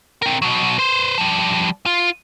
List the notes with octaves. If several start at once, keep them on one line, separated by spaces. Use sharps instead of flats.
C4 A#4
B2 F#3
B4 C5
F3 G3
F4